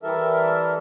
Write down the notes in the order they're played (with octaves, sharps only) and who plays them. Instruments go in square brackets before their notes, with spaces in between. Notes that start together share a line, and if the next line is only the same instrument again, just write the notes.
[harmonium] E3 G3 A4 A#4 E5